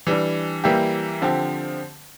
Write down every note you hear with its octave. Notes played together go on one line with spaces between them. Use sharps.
E3 G3 D4
E3 G3 A#3 E4 G4
D3 F3 C4 G4